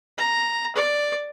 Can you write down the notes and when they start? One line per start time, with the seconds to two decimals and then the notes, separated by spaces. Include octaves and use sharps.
0.18 A#5
0.76 D5